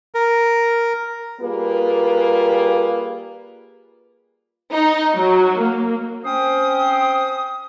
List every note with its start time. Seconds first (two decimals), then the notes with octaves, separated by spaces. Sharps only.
0.15 A#4
1.40 G3 A#3 F4 G#4 B4
4.71 D#4
5.15 F#3
5.61 A#3
6.24 C4 C#4 C5 G5 D#6